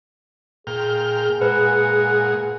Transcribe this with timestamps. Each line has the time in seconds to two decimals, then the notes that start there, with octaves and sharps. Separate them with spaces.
0.67 A#2 G#4 G5 F6
1.41 A#2 G#3 B4 F#5